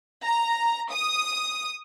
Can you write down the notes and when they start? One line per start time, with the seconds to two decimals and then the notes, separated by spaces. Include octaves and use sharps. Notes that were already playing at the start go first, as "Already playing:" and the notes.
0.24 A#5
0.92 D#6